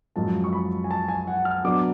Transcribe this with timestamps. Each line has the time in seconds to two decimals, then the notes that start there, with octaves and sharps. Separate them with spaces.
0.16 F#2 F3 G#3 A5
0.44 C#6
0.53 B5
0.84 G#5
0.91 A5
1.08 G#5
1.27 F#5
1.45 F6
1.64 B2 F#3 B3 D4 D6